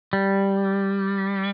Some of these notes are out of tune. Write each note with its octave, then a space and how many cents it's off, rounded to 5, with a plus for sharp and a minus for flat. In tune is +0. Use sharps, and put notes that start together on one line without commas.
G3 +0